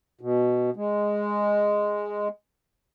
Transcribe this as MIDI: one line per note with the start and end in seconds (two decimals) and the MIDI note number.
0.21 0.70 47
0.76 2.28 56